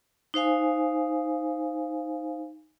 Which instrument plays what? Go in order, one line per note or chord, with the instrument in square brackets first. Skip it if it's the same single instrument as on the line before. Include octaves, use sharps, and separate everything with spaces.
[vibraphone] D#4 C5 F5 G#5